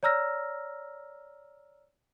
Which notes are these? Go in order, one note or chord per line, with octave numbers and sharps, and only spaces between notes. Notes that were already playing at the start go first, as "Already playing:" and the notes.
C#5 D5 A#5 E6 F6 A#6